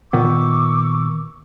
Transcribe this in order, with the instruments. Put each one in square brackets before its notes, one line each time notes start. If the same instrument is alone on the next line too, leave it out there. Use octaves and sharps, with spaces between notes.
[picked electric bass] A#2 D#3 B3 [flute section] C#6 D6 E6